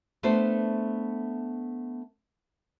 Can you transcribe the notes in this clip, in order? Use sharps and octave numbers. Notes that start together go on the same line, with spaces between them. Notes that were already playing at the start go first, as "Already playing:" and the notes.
A3 B3 D4 A4 C5